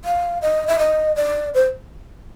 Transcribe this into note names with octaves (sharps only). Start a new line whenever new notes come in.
F5
D#5
E5
D#5
D5
C5